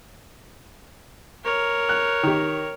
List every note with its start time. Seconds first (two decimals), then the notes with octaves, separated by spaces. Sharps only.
1.45 A#4 C#5
1.89 F#6
2.23 D#3 G4